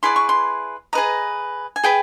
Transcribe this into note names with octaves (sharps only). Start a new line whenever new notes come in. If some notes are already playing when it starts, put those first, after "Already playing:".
E4 G#4 B4 D5 C6
C#6
C6
G#4 B4 D#5 A#5
G#5
G#4 B4 G5